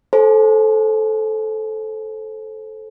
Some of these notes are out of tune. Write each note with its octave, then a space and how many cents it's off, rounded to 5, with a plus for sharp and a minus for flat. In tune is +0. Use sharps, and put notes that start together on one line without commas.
A4 -15 C5 +15 G#5 +40